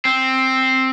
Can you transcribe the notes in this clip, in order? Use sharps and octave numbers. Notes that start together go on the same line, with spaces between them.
C4